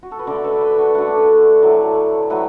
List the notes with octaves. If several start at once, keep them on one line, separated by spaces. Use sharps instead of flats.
F#4
A4
B4
D3 A3 A4 D5
B4 E5
B4 E5
D4 F#4
D3 A3 D5 F#5
A2 F#3 A3
A2 F#3 B4 E5